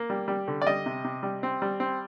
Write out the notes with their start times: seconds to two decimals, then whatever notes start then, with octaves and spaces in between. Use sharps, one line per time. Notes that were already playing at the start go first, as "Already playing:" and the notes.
Already playing: A#3
0.10 G3
0.28 G3
0.48 D3
0.62 D5
0.67 G3 D#5
0.86 C3
1.04 C3
1.23 G3
1.43 C4
1.62 G3
1.80 C4